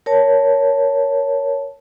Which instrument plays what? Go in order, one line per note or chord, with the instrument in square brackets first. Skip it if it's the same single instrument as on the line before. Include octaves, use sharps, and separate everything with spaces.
[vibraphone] A#4 C#5 A5